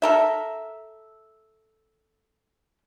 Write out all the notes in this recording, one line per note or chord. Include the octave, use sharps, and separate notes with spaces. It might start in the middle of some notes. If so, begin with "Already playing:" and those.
A4 A#4 E5